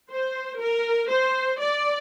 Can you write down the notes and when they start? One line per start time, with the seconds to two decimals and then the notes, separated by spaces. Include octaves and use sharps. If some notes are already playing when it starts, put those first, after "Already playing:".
0.11 C5
0.60 A#4
1.10 C5
1.60 D5